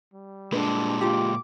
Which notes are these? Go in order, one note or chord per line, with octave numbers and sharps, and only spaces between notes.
G3
A#2 G#3 D4 B4
F4 G4 D6